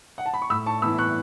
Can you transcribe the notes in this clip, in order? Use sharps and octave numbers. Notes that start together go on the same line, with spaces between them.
F#5
A5
B5
C#6
A2 B5 E6
A5 C#6
E3 B3 B5 E6
C#6 F#6